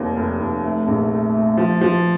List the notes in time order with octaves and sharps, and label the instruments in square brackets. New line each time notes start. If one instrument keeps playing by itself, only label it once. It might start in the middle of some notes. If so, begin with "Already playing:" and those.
Already playing: [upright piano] F1 D#2
F1
F1
A3
A#1
A3
A3
F3
F3